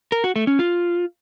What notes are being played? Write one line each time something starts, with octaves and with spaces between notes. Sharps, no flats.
A#4
F#4
A3
C#4
F4